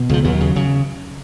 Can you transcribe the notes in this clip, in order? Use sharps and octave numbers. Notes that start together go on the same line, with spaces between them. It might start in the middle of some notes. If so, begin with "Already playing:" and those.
Already playing: B2
C#2 F3
D#2 F#3
C#3
C#3